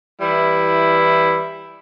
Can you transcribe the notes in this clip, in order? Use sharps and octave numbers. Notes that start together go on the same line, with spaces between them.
E3 G3 E4